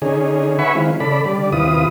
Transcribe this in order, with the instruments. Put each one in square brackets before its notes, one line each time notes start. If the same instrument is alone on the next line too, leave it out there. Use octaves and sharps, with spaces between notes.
[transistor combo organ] D3 C#4 D#4 G#4
B4 E5 F#5 G#5 B5 C#6
D#3 G#3 C4 E4 F4
C#3 A4 D5 B5
D3 G3 D5
D#2 C3 E4 F4 B4 D#6